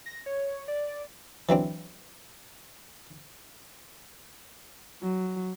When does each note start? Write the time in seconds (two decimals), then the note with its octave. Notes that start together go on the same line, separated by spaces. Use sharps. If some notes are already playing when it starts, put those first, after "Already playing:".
0.06 A#6
0.26 C#5
0.68 D5
1.49 E3 F#3 C4 D4
5.02 F#3